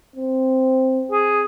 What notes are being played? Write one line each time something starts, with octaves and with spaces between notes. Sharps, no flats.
C4
G#4